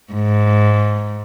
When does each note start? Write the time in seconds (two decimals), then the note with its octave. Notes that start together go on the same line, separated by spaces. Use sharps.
0.13 G#2